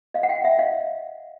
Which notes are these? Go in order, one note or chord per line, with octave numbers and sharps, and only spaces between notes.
D#5 F5
F#5
F5 G5
E5 F#5
D#5 F5